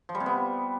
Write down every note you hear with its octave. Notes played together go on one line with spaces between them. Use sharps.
F3
G3
C3
B3